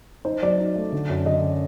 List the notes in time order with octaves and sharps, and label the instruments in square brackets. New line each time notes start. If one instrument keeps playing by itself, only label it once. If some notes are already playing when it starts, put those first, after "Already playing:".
[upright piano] D#4 C5
F#3 D5
D#4
A3
D3
F#2
D3 D#5